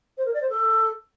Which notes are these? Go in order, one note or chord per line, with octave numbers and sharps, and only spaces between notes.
C5
A#4
D5
C5
A4